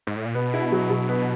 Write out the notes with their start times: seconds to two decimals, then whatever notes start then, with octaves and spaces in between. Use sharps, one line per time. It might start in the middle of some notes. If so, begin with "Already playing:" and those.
0.07 G#2
0.16 A2
0.25 A#2
0.35 B2 B3
0.54 E4
0.72 F#3
0.90 F#3
1.09 B3